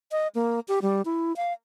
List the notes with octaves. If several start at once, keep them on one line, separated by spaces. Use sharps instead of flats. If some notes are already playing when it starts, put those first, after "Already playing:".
D#5
A#3
G4
G3
E4
F5